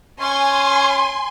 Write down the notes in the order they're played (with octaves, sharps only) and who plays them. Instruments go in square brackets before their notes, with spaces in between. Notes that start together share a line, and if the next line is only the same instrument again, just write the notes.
[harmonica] C#4 [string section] G#5 C6